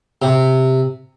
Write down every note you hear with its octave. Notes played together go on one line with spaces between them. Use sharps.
C3